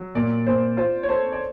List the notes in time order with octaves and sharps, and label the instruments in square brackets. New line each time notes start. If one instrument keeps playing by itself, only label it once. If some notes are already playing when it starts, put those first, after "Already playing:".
Already playing: [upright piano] F#3
[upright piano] A#2 [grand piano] D5
[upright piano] A#2 [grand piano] C5
[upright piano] F4 [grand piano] C5
[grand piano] C#5
[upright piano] A4 [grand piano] C5
[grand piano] D5